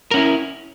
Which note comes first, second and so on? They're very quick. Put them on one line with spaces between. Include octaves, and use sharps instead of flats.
A#4 C#4 E4